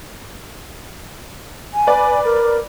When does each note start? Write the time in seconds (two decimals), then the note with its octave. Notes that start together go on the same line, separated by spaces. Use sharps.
1.74 G#5
1.87 B4 D5
2.25 A#4